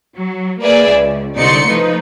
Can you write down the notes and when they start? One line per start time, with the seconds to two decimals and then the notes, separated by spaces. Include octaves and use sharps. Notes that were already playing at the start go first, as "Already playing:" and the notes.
0.16 F#3
0.62 A#3 G#4 B4 D5 E5
0.91 C#2
1.37 C2 D3 D#4 D5 C6 C#7
1.68 F3 A3 D#4 B4